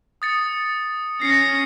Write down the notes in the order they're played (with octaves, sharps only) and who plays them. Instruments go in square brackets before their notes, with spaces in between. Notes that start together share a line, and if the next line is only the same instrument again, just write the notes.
[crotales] D#6 A6 C#7
[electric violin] C#4 A#6 [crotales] C7 C#7